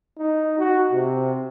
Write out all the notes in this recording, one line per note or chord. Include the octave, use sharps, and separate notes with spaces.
D#4
F#4
C3